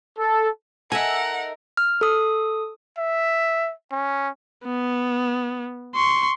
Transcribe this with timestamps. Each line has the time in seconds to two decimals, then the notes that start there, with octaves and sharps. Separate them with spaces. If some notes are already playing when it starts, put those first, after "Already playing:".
0.18 A4
0.92 D#4 A4 A#4 E5 F#5 G#5
1.77 F6
2.01 A4 D#6
2.98 E5
3.91 C#4
4.65 B3
5.95 C6 C#6